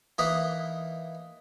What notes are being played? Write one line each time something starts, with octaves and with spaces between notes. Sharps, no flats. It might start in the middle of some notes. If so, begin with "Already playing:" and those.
E3 A#3 D#4 B4 D#5 A#5